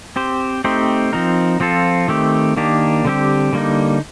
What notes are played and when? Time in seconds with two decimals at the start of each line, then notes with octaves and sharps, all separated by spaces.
0.16 C4 G4 C5
0.64 A3 C4 D#4 G4 C5
1.13 F3 C4 D#4 A#4
1.60 F3 C4 F4 A4
2.08 D#3 A3 C4 G4
2.57 D#3 A#3 D4 G4
3.05 D3 G3 C4 G4
3.53 D3 G3 A#3 D#4